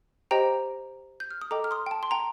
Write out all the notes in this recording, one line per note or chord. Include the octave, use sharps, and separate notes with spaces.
G4 C5 D#5 G5 A#5
G6
F6
D#6
A4 D#5 G5 A#5 D6
F6
C6 D#6
G5
A5
C6
G5 A#5